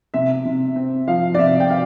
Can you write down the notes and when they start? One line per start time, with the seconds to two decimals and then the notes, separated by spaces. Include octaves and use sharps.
0.14 C3 E5
0.45 C3
0.76 C4
1.08 F3 F5
1.35 D5
1.39 C3 E5
1.60 G5
1.70 F5